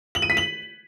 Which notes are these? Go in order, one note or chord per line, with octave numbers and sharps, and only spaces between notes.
F#7
D#7
B6
F#7